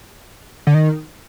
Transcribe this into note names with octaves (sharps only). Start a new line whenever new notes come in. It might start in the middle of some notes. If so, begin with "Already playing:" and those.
D3
D#3